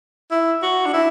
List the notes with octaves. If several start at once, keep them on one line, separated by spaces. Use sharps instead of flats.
E4
F#4
D4
E4